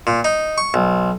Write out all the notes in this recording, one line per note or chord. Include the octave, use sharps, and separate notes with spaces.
A#2
D#4
C#6
B1